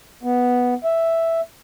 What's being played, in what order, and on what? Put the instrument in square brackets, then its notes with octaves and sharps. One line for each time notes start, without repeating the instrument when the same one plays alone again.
[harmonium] B3
E5